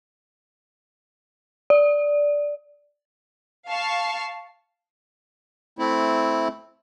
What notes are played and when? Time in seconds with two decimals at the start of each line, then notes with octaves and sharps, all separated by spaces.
1.70 D5
3.69 F5 A5 C#6
5.79 A3 C4 E4